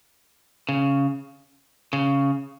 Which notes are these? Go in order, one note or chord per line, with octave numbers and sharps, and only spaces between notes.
C#3
C#3